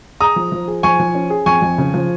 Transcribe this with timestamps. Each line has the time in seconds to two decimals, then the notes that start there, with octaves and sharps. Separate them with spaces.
0.20 G#4 A#5 D#6
0.36 F3
0.52 F3
0.68 G#4
0.83 F3 G#5 C#6
1.00 F3
1.15 C#4
1.30 G#4
1.46 F2 G#5 C#6
1.62 F2
1.78 C#3
1.94 F3